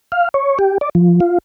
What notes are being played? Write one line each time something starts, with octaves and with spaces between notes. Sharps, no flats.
F5
C#5
G4
D5
F3
F4